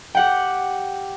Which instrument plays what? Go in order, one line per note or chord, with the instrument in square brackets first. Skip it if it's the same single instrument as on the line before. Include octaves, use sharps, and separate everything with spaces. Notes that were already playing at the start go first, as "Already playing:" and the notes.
[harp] G4 F#5 G5